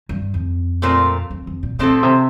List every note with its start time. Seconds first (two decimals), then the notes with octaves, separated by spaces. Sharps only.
0.09 G2
0.34 F2
0.82 A#2 A3 C4 F4 A#4
1.30 F2
1.47 F2
1.63 A#2
1.79 A#2 F3 A3 C4 E4 A4
2.03 C3